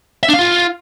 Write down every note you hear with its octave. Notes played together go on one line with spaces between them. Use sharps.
E5
D4
F5
F4